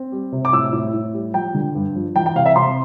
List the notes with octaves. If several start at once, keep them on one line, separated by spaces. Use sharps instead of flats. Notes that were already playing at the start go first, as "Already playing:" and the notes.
Already playing: C4
G3
C3
D6
A2 E6
A2
A2
G3
F3 G5
D3
G2
F3
E3 G5
G5
C3 F5
E5
C3 C6